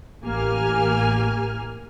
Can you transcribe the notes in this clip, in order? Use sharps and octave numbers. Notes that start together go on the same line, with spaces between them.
A1 A#3 G4 G#5 F6